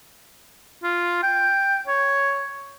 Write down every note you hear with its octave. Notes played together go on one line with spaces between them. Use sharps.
F4
G5
C#5